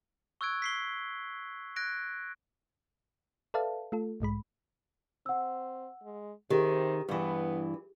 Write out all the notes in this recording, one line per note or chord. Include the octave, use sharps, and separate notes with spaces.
C#6 E6 F#6 G#6 D7
B6 C7 G7
F#6 G#6 A#6 D7
A4 B4 D5 E5 F5 A5
A3 F4 A4
B1 G#2 G#3 B5
C4 F#5 E6
G#3
C3 D#3 G4 G#4
G2 E3 B3